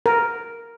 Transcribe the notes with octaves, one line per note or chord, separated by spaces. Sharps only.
A#4